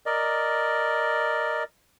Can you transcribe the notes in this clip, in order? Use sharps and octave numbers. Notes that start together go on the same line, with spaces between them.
A#4 D5 D#5